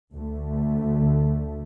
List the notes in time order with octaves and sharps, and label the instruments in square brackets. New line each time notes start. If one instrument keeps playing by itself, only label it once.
[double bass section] D2 D3 A3